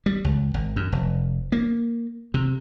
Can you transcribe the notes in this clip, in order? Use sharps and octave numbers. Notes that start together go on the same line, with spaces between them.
G3
C#2
G#1
F#2
F1
A#3
C3